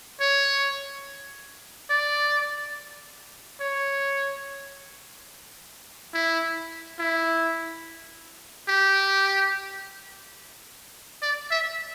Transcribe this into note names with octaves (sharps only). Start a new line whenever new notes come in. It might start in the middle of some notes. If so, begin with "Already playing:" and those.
C#5
D5
C#5
E4
E4
G4
D5
E5